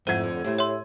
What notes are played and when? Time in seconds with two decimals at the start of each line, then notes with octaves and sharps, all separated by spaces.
0.07 F2 G#2 A3 E4 C5 F#5 G#6 D#7
0.24 D3
0.44 A2 A3 C4 E4 G4
0.59 C#5 E5 C6